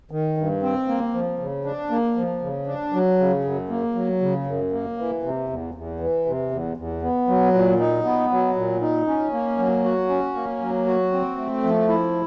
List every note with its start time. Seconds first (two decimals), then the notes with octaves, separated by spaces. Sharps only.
0.11 D#3
0.37 G2
0.63 C4
0.88 A#3
1.14 F3
1.39 C#3
1.65 D4
1.90 A#3
2.16 F3
2.42 C#3
2.67 D4
2.93 F#3
3.19 C#3
3.44 F#2
3.69 A#3
3.95 F#3
4.21 C#3
4.46 F#2
4.72 A#3
4.98 E3
5.23 C3
5.49 E2
5.74 E2
6.00 E3
6.26 C3
6.51 E2
6.77 E2
7.02 B3
7.28 F#3
7.54 A#2
7.79 D#4
8.05 B3
8.31 F#3
8.56 A#2
8.81 D#4
9.07 C#4
9.33 A#3
9.58 F#3
9.84 F#4
10.09 C#4
10.35 A#3
10.61 F#3
10.86 F#4
11.12 C4
11.37 A3
11.63 F3
11.89 E4